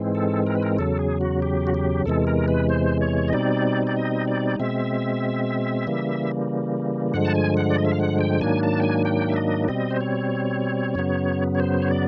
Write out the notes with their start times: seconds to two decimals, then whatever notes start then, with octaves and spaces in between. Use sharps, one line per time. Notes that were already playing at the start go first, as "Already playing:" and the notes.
Already playing: G#2 E3 G#3 C4
0.15 A4
0.47 A#4
0.55 B4
0.63 A#4
0.78 E2 C#3 F#3 A4
0.99 G#4
1.21 F#4
1.42 G4
1.67 F#4
1.74 G4
2.06 E2 C3 E3 G#3 A4
2.27 A#4
2.48 B4
2.69 C5
3.01 C#5
3.28 D#5
3.33 B2 G3 C4 D#4 D5
3.87 D5
3.97 D#5
4.28 D5
4.60 B2 G#3 C4 E5
5.87 C#3 E3 G3 A#3
7.14 G2 D3 F3 G#3 F#5
7.25 A5
7.35 G#5
7.57 F#5
7.70 D5
7.78 D#5
7.84 E5
7.92 F5
8.00 F#5
8.21 G5
8.41 G#2 D#3 F#3 A#3 D4 G#5
8.63 A5
8.80 G5
8.83 G#5
9.05 G5
9.29 E5
9.36 D#5
9.68 B2 G3 C4 D#5
9.91 C5
10.01 C#5
10.95 F#2 C#3 F#3 B3
11.55 C#5
11.60 C5
11.82 C#5
11.91 D5